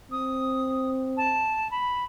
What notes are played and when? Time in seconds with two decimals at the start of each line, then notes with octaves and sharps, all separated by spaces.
0.12 C4 D#6
1.17 A5
1.71 B5